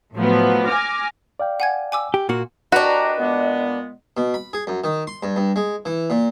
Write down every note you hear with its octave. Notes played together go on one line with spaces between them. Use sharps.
A2 F3 F#3 B3
G#5 D6 F6 A#6
D5 F5 G5
F#5 G#5 G#6
G#5 D6 E6
G4
A#2 A#3 F#4
C2 D4 F#4 B4 D#5 G5 A#5
A#2 G#3 B3
B2
B5
G#4
F#2
D#3
C6
G2
G2
G#3
E3
A#2